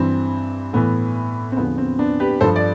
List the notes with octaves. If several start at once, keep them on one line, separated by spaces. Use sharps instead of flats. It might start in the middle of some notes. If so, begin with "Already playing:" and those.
Already playing: G2 E3 C4
A2 E3 B3
C4
E2 D3 F3 B3
C4
B3 D4
G4 B4
G2 F3 A4 C5
D5